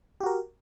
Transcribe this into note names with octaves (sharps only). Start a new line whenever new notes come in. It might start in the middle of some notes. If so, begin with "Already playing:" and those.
F#4 G4 A#4